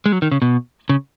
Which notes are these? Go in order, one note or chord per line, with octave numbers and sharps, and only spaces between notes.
G#3
F#3
D#3
C#3
B2
C#3